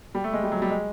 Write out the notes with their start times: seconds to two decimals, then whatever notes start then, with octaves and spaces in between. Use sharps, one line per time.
0.15 G3
0.24 A3
0.33 G#3
0.43 G3
0.52 F#3
0.62 G3
0.71 G#3